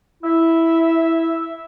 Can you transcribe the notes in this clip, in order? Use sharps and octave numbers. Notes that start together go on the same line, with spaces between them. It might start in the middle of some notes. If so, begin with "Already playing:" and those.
E4 E5